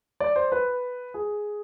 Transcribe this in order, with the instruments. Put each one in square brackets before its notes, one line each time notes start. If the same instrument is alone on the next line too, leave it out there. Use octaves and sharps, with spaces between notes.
[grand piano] D5
C5
B4
G#4